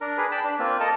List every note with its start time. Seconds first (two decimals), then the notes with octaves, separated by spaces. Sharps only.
0.01 D4 A#4
0.18 G#4 B4
0.32 G5 A5 B5
0.44 D4
0.59 A#3 C4 F4
0.80 A4 A#4 D#5 A5